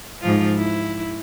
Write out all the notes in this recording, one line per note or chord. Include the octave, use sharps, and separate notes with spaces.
G#2 F3 F4
E4